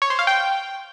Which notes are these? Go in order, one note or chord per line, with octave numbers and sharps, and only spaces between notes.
C#5
C5
F5
G5